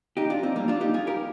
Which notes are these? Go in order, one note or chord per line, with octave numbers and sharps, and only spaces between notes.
D#4 G4
D4 F4
C4 D#4
G3 A#3
D4 F4
D#4 G4
F4 G#4
G4 A#4